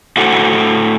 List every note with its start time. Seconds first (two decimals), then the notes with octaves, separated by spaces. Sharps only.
0.17 A2 F#4 A4 C5 F#5